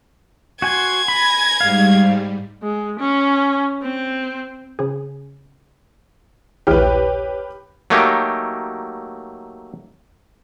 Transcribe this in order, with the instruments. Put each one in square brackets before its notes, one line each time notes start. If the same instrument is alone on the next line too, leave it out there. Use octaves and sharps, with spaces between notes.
[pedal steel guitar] F#4 G#5 [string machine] C6 [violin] G#6
[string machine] G#5 A#6 [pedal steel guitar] B5
[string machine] G#2 G3 [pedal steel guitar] F5
[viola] G#3
C#4
C4
[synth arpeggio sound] C#3 G#4
[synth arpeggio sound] A#1 D#2 E4 [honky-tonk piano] G4 B4 [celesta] C#5 F6
[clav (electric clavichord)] F#3 A3 A#3 D#4 G4